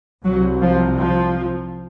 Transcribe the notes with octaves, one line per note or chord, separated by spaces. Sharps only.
C2 C3 F#3
F3
F3